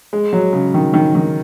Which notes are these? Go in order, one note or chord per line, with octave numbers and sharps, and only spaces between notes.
G#3
F#3
C#3
D#3
D#3
D#3